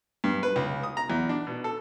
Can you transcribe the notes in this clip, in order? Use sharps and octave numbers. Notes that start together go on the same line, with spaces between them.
G2
B4
C#2
D#6
A#5
E2
D4
B2
A4